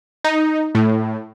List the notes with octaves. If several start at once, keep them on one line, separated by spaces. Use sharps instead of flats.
D#4
A2